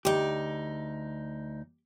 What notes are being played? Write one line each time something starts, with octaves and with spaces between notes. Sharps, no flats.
D2 D#4 G4